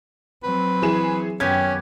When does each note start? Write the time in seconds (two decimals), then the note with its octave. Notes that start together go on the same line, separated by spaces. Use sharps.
0.43 F#3 C4 B4
0.82 E3 G#4 E7
1.40 F#2 D#3 B3 C#4 G4 G#6